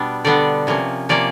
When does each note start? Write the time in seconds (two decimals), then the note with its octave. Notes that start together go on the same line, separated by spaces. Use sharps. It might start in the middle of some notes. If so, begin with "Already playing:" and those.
Already playing: B2 G3 B3 D4
0.25 D3 G3 B3 D4 D5
0.67 C3 F3 A#3 C#4
1.09 C3 F3 A#3 C#4 D5